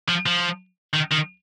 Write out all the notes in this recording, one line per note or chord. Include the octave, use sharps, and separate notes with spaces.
F3
F3
D#3
D#3